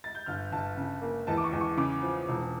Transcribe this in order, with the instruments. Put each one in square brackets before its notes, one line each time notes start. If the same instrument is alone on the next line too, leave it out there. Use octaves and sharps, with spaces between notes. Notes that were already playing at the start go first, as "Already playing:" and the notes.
[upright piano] A6
G6
G1 F6
G1 A5
C#3
A#3
E2 A5
D6
C#6
E2
C#6
C#3 D6
F3
E1